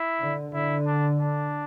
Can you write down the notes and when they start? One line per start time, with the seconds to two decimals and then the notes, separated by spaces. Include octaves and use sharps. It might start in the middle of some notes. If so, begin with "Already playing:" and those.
Already playing: E4
0.20 D3
0.54 D3 E4
0.86 D4
1.19 D4